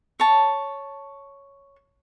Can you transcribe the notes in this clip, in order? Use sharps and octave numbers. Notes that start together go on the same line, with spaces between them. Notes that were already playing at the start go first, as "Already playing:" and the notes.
C#5 A5